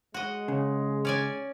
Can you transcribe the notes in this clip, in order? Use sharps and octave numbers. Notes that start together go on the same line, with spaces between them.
G#3 F#4 D#5
C#3
C#4 D5 G#5